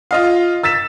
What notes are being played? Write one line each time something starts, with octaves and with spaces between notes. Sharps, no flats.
F4 D#5 F5
E6 A6 B6 E7